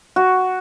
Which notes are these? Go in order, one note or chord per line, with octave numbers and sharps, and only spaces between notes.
F#4